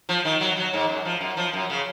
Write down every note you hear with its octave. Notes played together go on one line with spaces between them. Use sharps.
F3
D#3
F#3
F#3
G#2
F#2
F3
F#2
F3
F#2
C#3